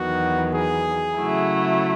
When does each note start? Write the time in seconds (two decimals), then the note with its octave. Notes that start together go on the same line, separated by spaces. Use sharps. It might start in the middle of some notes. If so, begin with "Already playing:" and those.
Already playing: E2 D#3 F#3 B3 F#4
0.54 G#4
1.17 C#3 F#3 A3 E4